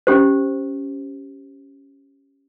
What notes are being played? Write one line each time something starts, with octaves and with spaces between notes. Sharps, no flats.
C#4 G4 C5